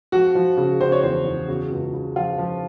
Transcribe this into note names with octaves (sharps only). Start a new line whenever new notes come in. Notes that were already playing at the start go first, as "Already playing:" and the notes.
F3 F#4
F3
C#3
C#3 C5
C#5
E2 C5
E2
C#3 F#4
C#2
C#3
F3 F4
F3